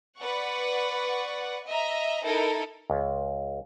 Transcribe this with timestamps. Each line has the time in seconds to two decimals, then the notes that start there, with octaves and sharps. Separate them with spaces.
0.18 B4 D5 F#5 C#6
1.66 D#5 E5 A#5
2.24 D#4 E4 A4 A#4
2.90 C#2